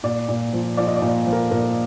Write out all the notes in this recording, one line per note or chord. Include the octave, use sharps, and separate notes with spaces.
A#2 D5
A#2
F3
F3 D5
D#5
D5
A#2
F3
A#4
A#2 A#4